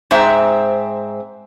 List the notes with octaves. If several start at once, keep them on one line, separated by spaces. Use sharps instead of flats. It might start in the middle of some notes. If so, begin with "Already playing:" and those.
G#2 C4 C5 E5 A#5